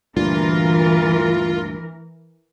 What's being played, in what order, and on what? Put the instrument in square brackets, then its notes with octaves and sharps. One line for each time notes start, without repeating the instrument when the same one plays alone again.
[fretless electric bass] D2 G2 A#2 [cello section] E3 A#4 [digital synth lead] F4